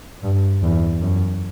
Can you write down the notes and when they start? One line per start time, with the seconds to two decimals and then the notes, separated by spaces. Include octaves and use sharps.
0.23 G2
0.63 E2
1.02 F#2